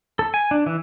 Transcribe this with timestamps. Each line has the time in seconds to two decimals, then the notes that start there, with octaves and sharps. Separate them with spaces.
0.19 A4
0.34 G#5
0.51 D4
0.66 E3